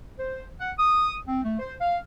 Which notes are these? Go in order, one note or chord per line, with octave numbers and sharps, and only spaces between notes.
C5
F#5
D#6
C4
A3
C5
F5